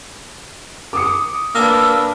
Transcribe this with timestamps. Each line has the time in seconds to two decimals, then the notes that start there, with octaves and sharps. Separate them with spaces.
0.93 D6 D#6 C#7
1.55 A#3 D4 B4 E6